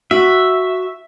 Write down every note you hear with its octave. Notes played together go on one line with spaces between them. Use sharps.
F#4 E5